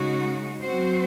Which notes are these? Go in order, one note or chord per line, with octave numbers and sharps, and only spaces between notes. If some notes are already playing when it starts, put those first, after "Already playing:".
Already playing: C#3 G#3 D#4 F#4
F#3 C4 F#4 C5